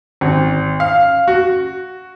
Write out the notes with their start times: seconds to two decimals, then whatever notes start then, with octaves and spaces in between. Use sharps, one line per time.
0.21 G#1
0.80 F5
1.28 F#4